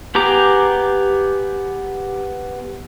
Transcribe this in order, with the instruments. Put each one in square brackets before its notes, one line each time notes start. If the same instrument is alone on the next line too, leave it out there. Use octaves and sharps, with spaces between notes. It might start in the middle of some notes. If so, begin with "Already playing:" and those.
[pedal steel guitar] B3 G4 G#4 A#5 D6